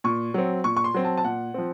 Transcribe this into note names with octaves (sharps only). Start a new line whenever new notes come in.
A#2 C#6
F#3 C4
A#2 C#6
C#6
C6
F#3 C4
A5
A5
A#2 F#5
F3 C4